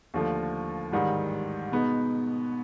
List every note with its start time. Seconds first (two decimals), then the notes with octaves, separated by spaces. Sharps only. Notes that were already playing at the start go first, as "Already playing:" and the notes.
0.14 D#2 D3 F3 A3
0.92 A1 G#2 D#3 G3
1.72 B2 G#3 B3 D#4